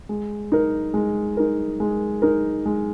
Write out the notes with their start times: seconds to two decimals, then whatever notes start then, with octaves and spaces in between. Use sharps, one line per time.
0.09 G#3
0.52 D#4 A#4
0.94 G#3
1.37 D#4 A#4
1.80 G#3
2.22 D#4 A#4
2.66 G#3